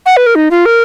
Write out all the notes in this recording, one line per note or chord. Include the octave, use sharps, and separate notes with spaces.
F#5
B4
A#4
D#4
F4
A#4